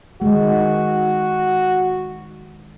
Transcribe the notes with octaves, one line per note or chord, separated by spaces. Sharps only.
D#3 G#3 F#4